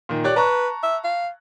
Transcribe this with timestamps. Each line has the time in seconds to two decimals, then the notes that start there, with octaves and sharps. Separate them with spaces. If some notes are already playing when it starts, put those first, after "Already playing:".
0.09 A#2 D#3
0.24 G4 C#5 D5 F#6
0.36 B4 A5 A#5 C#6
0.83 E5
1.04 F5